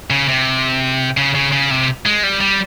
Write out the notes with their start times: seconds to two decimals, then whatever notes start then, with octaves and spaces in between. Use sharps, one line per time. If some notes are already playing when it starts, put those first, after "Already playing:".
0.10 C#3
0.28 C3
1.17 C#3
1.35 C#3
1.52 C#3
1.71 C3
2.06 G#3
2.23 G3
2.41 G3